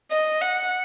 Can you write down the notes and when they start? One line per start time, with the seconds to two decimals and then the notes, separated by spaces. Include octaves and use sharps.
0.11 D#5
0.42 F#5